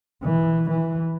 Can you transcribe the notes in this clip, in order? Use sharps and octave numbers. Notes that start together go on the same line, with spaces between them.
E3
E3